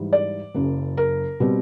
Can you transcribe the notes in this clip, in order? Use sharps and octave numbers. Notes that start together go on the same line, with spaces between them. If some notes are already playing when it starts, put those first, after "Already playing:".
Already playing: G#2 E3 G3
D5
F#1 F#2 C#3
A#4
B2 G3 C4